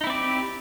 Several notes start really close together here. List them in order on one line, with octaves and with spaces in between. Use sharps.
D#4 E4 C4 D5 G4